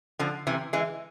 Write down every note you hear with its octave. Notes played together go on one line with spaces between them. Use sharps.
D3 F3
C3 E3
E3 G#3